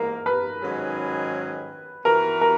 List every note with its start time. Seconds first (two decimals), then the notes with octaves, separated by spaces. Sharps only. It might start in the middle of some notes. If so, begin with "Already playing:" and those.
Already playing: G#2 E3 A#3 A#4
0.26 B4
0.62 G#2 D#3 F#3 C#4 G#4
2.05 E3 B3 F#4 A#4 B4
2.41 A#4